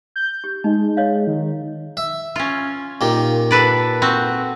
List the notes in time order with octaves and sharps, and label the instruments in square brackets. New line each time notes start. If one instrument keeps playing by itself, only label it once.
[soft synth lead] G6
[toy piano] G4
[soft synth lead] G#3 [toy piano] D#4
[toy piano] C#5 D#5 F5
[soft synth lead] D#3
[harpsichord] E5
[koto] C#4 F4
[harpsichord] A#2 D#3 G4
[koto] A4 B4 D5
C4 F#4